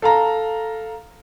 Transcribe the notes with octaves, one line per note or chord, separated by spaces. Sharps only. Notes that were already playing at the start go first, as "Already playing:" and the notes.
A4 F5 A#5